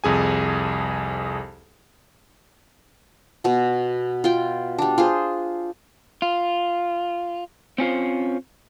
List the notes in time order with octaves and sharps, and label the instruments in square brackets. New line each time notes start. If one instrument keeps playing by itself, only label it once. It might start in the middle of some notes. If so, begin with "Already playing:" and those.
[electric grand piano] C2 F2 G#4 G#5
[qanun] B2 F#4
F4 G5
G3 D4
F4 G#4 C5
[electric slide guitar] F4
C4 C#4 F4 C5